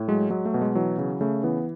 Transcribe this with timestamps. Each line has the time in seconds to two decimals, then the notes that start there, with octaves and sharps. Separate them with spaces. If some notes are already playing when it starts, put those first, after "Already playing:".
Already playing: A2
0.08 F#3 G#3
0.30 F#3 G#3
0.45 A3
0.54 B2
0.62 G#3
0.75 E3 F#3
0.98 C#3 F#3
1.21 C#3 A3
1.43 E3 B3